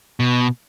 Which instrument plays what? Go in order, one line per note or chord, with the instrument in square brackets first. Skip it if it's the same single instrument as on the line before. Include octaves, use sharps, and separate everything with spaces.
[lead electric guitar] B2